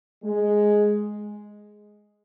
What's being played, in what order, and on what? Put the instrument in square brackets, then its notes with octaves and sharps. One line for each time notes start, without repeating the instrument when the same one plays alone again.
[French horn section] G#3